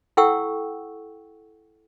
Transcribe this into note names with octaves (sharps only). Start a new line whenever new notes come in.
E4 A4 F#5 G5 C#6 E6